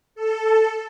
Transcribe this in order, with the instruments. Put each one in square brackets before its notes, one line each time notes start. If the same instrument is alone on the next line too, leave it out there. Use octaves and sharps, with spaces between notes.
[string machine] A4